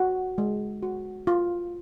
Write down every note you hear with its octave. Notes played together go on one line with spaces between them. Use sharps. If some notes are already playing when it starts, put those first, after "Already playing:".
Already playing: F#4
G#3
F#4
F4